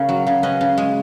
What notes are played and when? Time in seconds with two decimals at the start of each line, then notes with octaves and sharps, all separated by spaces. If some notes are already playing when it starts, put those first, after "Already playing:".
Already playing: C#3 C#4 A#4
0.09 F#3
0.27 C#3
0.43 C#4 B4 D#5
0.61 C#3
0.78 G#3